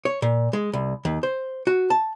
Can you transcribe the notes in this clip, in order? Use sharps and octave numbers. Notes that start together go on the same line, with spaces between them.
C#5
A#2
G#3
C2
D#2
C5
F#4
A5